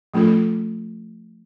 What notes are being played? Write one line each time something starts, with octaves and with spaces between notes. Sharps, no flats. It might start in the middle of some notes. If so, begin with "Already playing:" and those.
F3 A3 C#4 F4 A4